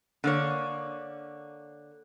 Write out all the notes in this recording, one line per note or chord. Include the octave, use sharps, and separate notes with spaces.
D3 A#3 C#5